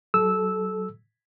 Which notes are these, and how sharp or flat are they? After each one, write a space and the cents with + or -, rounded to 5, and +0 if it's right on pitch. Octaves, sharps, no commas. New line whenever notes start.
F#3 +30 A4 -20 E6 -10